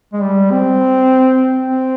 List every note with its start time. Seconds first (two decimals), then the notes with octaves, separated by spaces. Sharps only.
0.13 G#3
0.22 G3
0.51 C4
1.65 C4